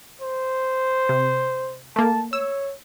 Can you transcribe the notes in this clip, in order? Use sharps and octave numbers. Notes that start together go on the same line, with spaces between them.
C5
C3
A3 A#3 A5
C#5 E6